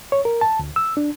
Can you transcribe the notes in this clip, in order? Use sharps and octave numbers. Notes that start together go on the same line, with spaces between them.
C#5
A#4
A5
D2
E6
D4